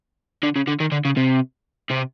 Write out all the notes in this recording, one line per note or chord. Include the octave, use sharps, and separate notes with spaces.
D3
C#3
D3
D#3
D3
C#3
C3
C3